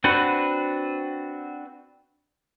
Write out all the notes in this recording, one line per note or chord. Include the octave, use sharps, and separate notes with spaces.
C4 D4 F#4 B4